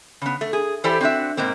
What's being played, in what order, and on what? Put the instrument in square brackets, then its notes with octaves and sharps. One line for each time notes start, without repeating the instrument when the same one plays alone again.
[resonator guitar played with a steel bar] C#3 B3
A3
G#4
E3 E4 G4 A4 C5 D5
C4 D4 F#4 E5
G#2 B2 A#3 C4